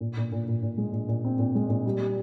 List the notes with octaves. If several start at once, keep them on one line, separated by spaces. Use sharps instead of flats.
A#2
A#2
A#2
A#2
A#2
G#3
A#2
A#2
C4
A#2
G#3
A#2
G3
G3